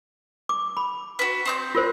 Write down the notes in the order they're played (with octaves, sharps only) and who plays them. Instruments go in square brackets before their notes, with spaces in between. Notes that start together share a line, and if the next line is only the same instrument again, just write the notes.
[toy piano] D6
B5
[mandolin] F#4 B4
C4 D#6 G6
[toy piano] F4 A#4 C5